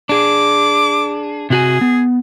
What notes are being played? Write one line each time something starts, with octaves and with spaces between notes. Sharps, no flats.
D4 G#4 D6
C3 F#4 G#4 G#5
B3